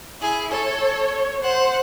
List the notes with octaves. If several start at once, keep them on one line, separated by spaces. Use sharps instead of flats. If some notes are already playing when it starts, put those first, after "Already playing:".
E4 G#4
A4 C#5
C5 F#5